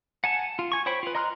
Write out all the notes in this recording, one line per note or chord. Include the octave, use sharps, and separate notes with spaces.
F#5 G#5 A5
F4
G#5 C#6
C5 C#5 G5 B5
F4 B4
D#5 A#5 C6 F6 F#6